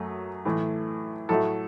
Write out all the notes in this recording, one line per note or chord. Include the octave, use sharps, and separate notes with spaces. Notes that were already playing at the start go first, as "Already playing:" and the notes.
Already playing: F#2 F#3 A3
A2 E3 A3
A2 F#3 A3 A4